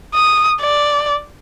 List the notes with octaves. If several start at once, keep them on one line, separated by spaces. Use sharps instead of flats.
D#6
D5